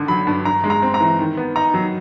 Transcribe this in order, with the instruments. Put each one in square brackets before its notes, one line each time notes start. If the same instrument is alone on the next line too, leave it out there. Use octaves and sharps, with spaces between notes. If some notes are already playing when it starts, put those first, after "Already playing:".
Already playing: [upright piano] G#1 D3
[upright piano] F#3 [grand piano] B5
[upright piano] G2
[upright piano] G2 [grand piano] A#5
[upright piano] G#3
[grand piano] A#5
[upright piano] C4
[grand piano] A#5
[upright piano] E3
D#3
B3
[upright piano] D#4 [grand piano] A#5
[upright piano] F#3